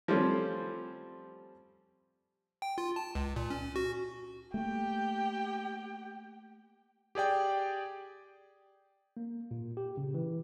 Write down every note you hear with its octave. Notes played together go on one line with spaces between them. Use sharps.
F3 G3 A3 C4 C#4
G5
F4
A5
C#2
A#2
C#4
F#4
A3 A#3 G4 G5
G4 G#4 D5 G5
A#3
A#2
G4
C#3
E3